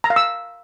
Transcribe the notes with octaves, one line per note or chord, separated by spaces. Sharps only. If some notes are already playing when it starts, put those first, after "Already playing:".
A#5
F5
E6